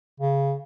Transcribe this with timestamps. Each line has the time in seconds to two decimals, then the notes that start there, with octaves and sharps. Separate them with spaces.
0.20 C#3